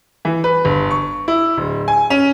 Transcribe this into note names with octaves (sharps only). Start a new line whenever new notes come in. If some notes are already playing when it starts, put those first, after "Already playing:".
E3
B4
G1
C#6
E4
D1
G#5
C#4